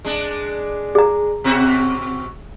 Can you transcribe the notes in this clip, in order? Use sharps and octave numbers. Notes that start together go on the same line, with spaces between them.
G#3 D4
G#4 A#5
B2 C4 F#4